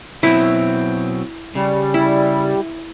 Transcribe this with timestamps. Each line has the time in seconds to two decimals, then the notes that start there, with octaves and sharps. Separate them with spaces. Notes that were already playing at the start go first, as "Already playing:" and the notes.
0.23 B2 F#3 C4 E4
1.55 C#3 G3
1.94 E4